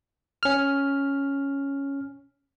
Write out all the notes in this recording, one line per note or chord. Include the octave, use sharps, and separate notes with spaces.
C#4 F6